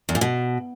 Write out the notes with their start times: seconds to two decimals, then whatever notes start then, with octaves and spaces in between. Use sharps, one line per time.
0.09 E2
0.15 A#2
0.21 B2